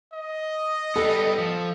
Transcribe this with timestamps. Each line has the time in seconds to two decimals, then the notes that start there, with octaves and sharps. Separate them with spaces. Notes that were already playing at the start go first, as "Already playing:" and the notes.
0.13 D#5
0.96 G3 B3 A4
1.38 F3